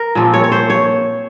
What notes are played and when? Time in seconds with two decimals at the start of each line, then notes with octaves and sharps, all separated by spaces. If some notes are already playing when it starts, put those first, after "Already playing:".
Already playing: A#4
0.15 A#2 F3 C4
0.34 C#5
0.44 C#5
0.52 C5
0.70 C#5